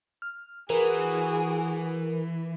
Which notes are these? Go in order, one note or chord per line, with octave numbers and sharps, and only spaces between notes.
F6
E3 F#4 G#4 A#4 B4